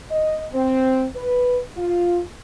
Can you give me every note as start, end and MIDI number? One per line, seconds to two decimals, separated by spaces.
0.11 0.45 75
0.52 1.04 60
1.16 1.59 71
1.77 2.19 65